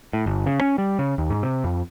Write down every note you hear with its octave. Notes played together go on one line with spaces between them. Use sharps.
A2
G1
C#3
C#4
G3
C#3
D#2
G#2
C3
F2